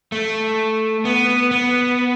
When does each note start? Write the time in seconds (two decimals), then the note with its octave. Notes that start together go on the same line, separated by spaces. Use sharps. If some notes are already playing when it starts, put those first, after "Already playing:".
0.12 A3
1.05 B3
1.51 B3